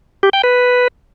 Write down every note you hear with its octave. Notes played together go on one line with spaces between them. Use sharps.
G4
G5
B4